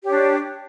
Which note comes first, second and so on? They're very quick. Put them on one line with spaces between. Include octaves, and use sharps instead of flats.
G4 C#5 D4